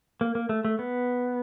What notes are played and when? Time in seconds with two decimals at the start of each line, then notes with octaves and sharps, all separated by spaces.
0.21 A#3
0.35 A#3
0.49 A3
0.65 A3
0.79 B3